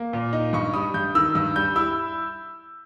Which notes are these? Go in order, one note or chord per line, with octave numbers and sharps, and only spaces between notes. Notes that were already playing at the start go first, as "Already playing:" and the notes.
Already playing: A#3
A#2
D#4
G2 C#6
G3 D#6
G2 G6
D#3 E6
G2 E6
G3 G6
E4 E6